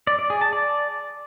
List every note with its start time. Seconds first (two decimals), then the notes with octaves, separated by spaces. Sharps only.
0.07 D5
0.19 D5
0.30 G#4
0.41 A5
0.53 D5